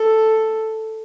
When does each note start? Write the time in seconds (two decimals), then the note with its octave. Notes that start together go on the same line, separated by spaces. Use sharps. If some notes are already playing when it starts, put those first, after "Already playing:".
Already playing: A4